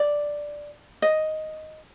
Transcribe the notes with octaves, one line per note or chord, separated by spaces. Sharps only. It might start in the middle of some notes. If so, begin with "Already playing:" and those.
Already playing: D5
D#5